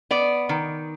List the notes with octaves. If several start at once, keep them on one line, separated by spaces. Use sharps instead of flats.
B3 D5
D#3